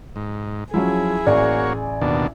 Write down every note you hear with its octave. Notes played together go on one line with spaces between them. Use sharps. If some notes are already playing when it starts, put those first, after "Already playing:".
G#2
F3 F#3 C#4 E4 G#4
A1 A#3 F#4 C#5 D5 G#5
D#2 B2 D4